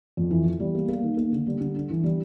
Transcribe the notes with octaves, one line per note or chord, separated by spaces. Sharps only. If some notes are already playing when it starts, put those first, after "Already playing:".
F2
E3
E3
G3
A#3
A#3
D#3
A#3
D3
G3
D3
D4
E3
G3